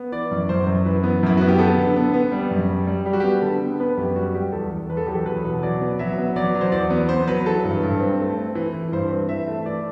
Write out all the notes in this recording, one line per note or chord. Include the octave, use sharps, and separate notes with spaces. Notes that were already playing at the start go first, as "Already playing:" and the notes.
Already playing: B3
E3 D5
F#2
F#2 C5
F#2
E3 B4
B3
F#2 E4
B3 F#4
G4
B3 A4
D3
B3
B3
G3
F#2
G3
G3
G3 G4
F#4
B3 G4
D3 A4
B3
B3 B4
F#2 G4
G3 F#4
G3 G4
E2 A4
E2
E2 B4
A4
F#3 G4
A4
E2 B4
B2
F#3 D5
B3
F#3 E5
B3
F#3 D5
F#3
C5
E2 D5
B3
B3 C5
F#3 B4
E3 A4
G2
G2
C4
A3
C4
E3
E3
G2 C5
C4
E3 E5
A3
E3 D5